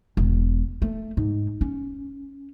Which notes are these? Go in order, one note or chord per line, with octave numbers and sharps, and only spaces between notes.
E1
A3
G#2
C#4